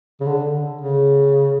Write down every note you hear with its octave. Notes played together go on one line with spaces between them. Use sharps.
C#3
D3
C#3